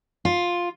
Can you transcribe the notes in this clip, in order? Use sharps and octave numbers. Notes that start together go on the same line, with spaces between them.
F4